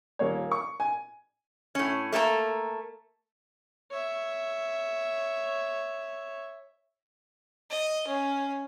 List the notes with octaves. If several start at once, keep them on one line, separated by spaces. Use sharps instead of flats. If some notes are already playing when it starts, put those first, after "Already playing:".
D#1 A#3 C#5
C#6
G#5
A2 C#4
A3 A#3 A4 A#5
C#5 E5
D#5
C#4